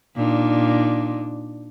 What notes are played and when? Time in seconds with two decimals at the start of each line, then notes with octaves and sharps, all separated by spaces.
0.16 A#2 D4 D#4